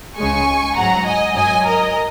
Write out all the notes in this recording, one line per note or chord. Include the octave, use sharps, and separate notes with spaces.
C#2 C#3 G#3 G#5 C#6
G#2 F#3 F#5 A#5
D#5 G#5
F#2 F#3 D#5 G#5
A#4 D#5